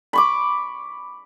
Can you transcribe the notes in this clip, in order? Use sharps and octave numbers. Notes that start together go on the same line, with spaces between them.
B5 C#6 D6